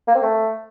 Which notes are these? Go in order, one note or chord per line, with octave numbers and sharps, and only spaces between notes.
A#3
C4
A3